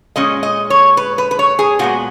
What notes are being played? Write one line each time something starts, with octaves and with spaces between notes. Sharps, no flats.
A#2 G#3 C#4 D#5
D#5
C#5
B4
B4
B4
C#5
G#4
A#2 G#3 B3 F#4